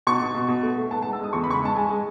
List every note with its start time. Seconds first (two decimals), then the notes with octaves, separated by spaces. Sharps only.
0.07 B2 C#6
0.21 B2
0.35 B2
0.48 B2
0.62 A3
0.76 A3
0.91 B3 A5
1.02 A5
1.05 G#3
1.13 E6
1.19 G#3 D#6
1.33 E2 C#6
1.44 B5
1.47 C#3 C#6
1.54 B5
1.62 G#3 A5
1.75 G#3 G#5
1.90 G#3